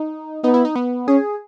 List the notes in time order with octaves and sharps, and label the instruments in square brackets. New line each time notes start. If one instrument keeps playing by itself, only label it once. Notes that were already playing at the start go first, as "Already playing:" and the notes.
Already playing: [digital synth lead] D#4
[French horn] B3 [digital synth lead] D#4
[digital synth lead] E4
D#4
B3
[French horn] C#4 [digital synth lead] G#4